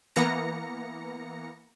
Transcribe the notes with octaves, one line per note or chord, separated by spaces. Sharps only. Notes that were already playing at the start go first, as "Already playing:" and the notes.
E3 A#3 B3 A#5 A#6 C#7